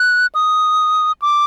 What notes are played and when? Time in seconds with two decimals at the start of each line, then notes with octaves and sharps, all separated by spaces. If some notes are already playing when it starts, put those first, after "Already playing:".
Already playing: F#6
0.35 D#6
1.22 D6